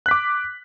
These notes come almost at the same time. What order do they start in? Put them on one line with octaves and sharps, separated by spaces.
F#6 B6 D6